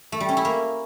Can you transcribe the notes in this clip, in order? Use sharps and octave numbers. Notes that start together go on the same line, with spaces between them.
A3
G3
C#4
E4
A#3